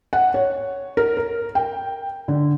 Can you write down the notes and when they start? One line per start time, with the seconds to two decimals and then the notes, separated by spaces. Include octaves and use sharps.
0.13 F#5
0.34 C#5
0.97 A#4
1.17 A#4
1.55 G5
2.28 D3